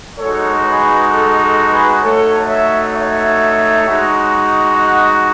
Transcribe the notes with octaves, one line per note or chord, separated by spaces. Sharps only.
G#3 D#4 F#4 A4 C#5
G#4 B4
A4
A4
G#4 B4
A3 D#4 F#4 A4 C#5
C#5 E5
C#5 E5
G#3 D#4 F#4
D#5 F#5